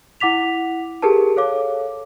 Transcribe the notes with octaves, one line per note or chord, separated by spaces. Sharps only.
E4 F#5 D6 B6 F7
G4 G#4 A#4 B4 A5
A4 C#5 F5 D6